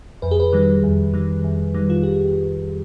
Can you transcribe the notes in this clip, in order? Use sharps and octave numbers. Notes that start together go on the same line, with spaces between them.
F2 B4
G#4
B4
D#3 G3
F2
D#3 G3
F2
D#3 G3
F4
G4